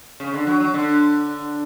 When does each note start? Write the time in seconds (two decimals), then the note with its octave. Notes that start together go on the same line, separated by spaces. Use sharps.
0.20 C#3
0.34 D3
0.47 F#3
0.60 F#3
0.74 D3